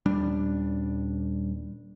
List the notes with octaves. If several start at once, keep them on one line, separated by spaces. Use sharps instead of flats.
D#1 G3 D4